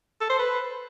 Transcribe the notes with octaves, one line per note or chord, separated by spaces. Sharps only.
A4
C5
B4